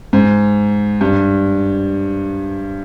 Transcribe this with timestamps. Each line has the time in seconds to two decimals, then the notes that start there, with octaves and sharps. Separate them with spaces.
0.13 G#2
1.01 G2